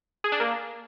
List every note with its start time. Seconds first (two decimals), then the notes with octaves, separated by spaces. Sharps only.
0.24 G#4
0.32 D4
0.40 A#3